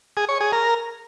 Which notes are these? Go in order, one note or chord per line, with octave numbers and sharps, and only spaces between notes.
G#4
C#5
G#4
A#4